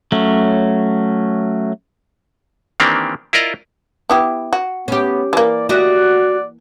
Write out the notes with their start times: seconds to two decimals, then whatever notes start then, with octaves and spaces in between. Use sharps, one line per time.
0.12 F#3 A3 C#4
2.80 D#3 E3 A#3 C4 D4 G4
3.33 E4 F4 A#4 D5 D#5 A#5
4.10 B3 E4 G4
4.53 F#4
4.88 B3 C#4 G4
5.33 E3 A#3 D5
5.69 F#4 G4 D5 D#5